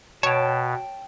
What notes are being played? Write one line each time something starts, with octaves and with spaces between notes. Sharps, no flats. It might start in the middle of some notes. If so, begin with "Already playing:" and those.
B2 C#5 G5 A5